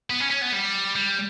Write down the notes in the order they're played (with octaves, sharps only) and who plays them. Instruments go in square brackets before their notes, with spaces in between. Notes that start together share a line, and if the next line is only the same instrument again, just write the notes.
[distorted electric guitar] B3
C#4
C#4
B3
G3
G3